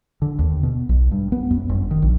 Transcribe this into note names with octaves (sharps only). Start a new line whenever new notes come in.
D3
D#2
B2
B1
G2
B3
F#2
G1
D#3
A#1